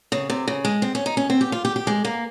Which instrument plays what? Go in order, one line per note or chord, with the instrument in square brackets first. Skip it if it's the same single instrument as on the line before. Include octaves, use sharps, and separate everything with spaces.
[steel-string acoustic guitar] C#3
C3
C#3
G#3
C4
C#4
D#4
C#4
C4
G4
F4
G4
G4
G#3
A#3